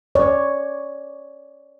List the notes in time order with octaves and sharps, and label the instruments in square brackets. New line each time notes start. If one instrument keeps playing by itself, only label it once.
[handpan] C#5 D5